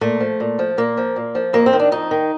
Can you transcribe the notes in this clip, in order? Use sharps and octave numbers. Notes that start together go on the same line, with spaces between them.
A#2 A3
F3
A#2
F3
A#2 A#3
F3
A#2
F3
F2 A#3
C4
D#3
D4
F2 D#4
D#3